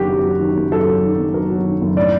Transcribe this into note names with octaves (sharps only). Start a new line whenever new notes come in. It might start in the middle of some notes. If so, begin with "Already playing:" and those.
Already playing: F#1 D#3 F#3 F#4 G4
F#2
F#3
D#3
F#1
F#2 A4
F#3
D#3
F#1
F#2 A#4
F#3
D#3
F#1
A2 D5